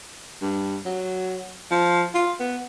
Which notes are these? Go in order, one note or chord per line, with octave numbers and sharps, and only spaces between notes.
G2
F#3
F3
F4
B3